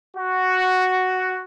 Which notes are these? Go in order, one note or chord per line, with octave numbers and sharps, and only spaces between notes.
F#4